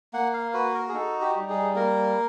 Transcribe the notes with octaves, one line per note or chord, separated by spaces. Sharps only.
A#3 F#5
F5
F#4 B4
A#4
G#4
D#4 A4
G4
G3
G#4
A#3 A#4